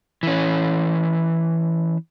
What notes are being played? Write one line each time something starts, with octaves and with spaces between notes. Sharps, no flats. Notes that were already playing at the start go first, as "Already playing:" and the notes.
E3 C#4